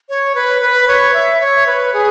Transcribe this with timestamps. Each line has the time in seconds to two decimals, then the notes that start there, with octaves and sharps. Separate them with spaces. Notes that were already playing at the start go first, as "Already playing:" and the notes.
0.09 C#5
0.35 B4
0.62 B4
0.88 C#5
1.14 E5
1.41 C#5
1.66 B4
1.93 G#4